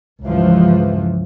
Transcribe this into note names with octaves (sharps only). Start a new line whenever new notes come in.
C#2 G2 E3 F3